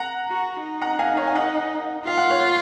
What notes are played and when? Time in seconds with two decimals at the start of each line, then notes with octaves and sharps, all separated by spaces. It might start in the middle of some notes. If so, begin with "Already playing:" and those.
Already playing: F#5 A#5
0.28 F#4
0.64 D#4
0.81 F#5 A#5
0.99 F5 G#5
1.17 C#5 F5
1.27 G#5
1.35 D#5 F#5
2.07 F4 F5
2.17 F#5
2.30 C#5 F5